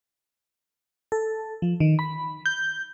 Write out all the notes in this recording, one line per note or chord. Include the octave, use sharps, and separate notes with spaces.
A4
F3
D#3
B5
G6